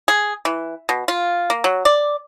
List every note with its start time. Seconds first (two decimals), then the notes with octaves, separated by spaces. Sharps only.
0.08 G#4
0.45 E3
0.89 B2
1.08 F4
1.50 A#3
1.64 F#3
1.85 D5